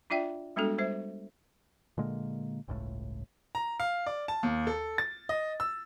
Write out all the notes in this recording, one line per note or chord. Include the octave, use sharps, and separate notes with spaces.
D4 F4 D5 E5 G5
G3 G#3 B3 D4 F#4 A4
G3 C5 E5
A#2 D3 G#3 A#3
G1 C#2 A2
A#5
F5
D5
A5
D#2
A4
A6
D#5
E6